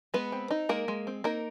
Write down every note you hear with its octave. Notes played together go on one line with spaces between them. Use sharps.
G#3 B3 B4
C4
D#4
G#3 A#3 A#4
G#3
C4
A#3 D#4 A#4